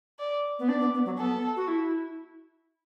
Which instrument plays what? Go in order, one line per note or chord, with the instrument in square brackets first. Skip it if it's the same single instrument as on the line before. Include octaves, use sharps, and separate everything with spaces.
[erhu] D5
[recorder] B3
[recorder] D4 [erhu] D5
[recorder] B3
B3
F#3
[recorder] B3 [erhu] A4
[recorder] F#4
E4